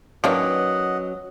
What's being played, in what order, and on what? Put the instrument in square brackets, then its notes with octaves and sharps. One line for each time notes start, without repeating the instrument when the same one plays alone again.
[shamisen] D#3 A#3 D4 [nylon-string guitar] F#3 C#4 B4 [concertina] D#5 F#5